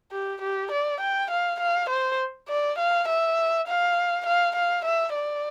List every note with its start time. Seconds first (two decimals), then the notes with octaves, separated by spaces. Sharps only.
0.12 G4
0.42 G4
0.72 D5
1.01 G5
1.31 F5
1.60 F5
1.89 C5
2.49 D5
2.78 F5
3.08 E5
3.67 F5
4.26 F5
4.56 F5
4.85 E5
5.15 D5